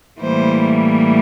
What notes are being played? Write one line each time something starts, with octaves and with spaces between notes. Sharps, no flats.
A2 E3 G3 A#3 C5